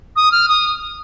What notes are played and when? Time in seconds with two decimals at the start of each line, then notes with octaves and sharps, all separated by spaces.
0.16 D#6
0.32 F6
0.48 D#6